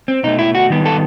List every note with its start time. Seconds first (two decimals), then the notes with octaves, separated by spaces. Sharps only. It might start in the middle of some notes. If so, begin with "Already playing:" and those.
0.08 C4
0.23 B2 A3 D#4
0.39 E4
0.55 F#4
0.70 D#3 G3 B3
0.86 A4